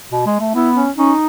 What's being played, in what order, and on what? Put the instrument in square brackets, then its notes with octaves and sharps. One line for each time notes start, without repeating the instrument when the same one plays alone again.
[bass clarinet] B2
G#3
A3
[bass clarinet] B3 [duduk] E4
[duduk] C#4
[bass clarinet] C#4 [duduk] D#4